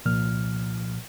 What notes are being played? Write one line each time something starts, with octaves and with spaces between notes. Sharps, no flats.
C2 A#2 F3 F6